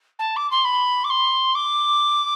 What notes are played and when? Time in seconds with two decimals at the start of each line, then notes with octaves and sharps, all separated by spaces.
0.19 A5
0.36 D6
0.51 C6
0.64 B5
1.04 D6
1.09 C6
1.55 D6